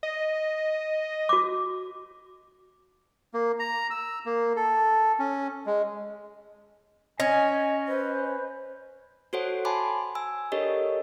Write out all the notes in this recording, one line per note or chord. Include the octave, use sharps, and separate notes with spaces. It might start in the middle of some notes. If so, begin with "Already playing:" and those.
D#5
F#4 D6
A#3
A#5
E6
A#3
A4
C#4
G#3
C#4 D#5 G#5
B4 C5
F#4 A4 C5 C#5 F#5
G#5 A5 B5 C6 D6
G#5 E6
D4 G4 A4 A#4 C#5 D#5